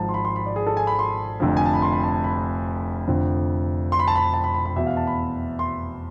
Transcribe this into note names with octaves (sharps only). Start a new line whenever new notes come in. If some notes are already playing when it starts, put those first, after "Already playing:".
Already playing: G#1 G#2 F3 A5
C6
B5
C6
B5
D5
G#4
A4
G#5
B5
C6
F1 F2 D3 F3
G#5
A5
B5
C6
B5
A5
A5
B5
F1 F2 D3 F3
C6
B5
A5
B5
A5
B5
B5
B5
E2 B2 E5
F5
A5
B5
C6